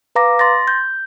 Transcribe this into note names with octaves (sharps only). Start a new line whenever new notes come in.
B4 F5 A#5 D6 A#6
C6 A6 A#6
G6